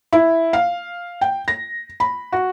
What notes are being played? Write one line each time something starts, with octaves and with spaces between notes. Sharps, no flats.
E4
F5
G5
A#6
B5
F#4